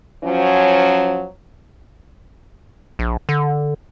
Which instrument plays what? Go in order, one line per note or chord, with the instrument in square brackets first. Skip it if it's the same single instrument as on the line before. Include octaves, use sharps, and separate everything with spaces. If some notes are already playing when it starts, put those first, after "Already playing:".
[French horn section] F3 F#3 C#4
[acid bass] A#1
D3